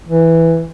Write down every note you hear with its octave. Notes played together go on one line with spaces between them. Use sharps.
E3